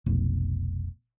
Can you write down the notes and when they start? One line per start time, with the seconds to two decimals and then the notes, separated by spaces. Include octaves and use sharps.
0.06 F1 B1